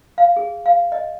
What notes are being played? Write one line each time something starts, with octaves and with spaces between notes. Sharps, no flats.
F5
G#4
F5
D#5